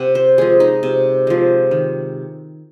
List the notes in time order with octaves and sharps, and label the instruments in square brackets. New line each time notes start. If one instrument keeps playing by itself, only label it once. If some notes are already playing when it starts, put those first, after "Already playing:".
Already playing: [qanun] C3 F#5
C5
F3 G#3 G#4
D#4
C3
F3 G#3
D#3